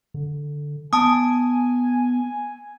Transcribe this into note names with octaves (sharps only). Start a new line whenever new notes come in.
D3
B3 G#5 A5 D#6